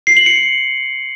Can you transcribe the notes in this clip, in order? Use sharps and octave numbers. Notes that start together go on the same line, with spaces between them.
C7
F#7
C#7